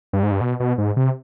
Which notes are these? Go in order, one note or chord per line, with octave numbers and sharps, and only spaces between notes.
G2
G#2
G2
B2
B2
G#2
C3